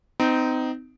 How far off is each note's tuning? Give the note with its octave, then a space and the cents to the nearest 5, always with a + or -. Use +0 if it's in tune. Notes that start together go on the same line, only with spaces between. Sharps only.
C4 -30 D#4 +0